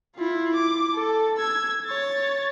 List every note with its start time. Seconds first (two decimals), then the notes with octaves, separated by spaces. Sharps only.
0.15 E4 F4
0.54 D6
0.94 A4
1.37 E6 G#6
1.85 C#5 A6